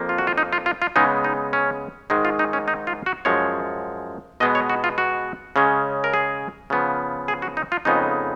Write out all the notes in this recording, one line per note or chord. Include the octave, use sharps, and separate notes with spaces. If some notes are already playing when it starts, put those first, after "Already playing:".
Already playing: F2 F3 A#3
F4
F#4
F4
D#4
F4
F4
F4
C#3 G#3 B3 D#4
D#4
C#4
G#2 D#3 G#3 D#4
F4
D#4
C#4
D#4
F4
F#4
F#2 F3 G#3 C#5
B2 G#3 B3 D#5
C#5
F#4
F4
F#4
C#3 G#3 C#4
A#4
G#4
C#3 F3 B3
G#4
F#4
D#4
F4
F2 C#3 G#3 B3 D#4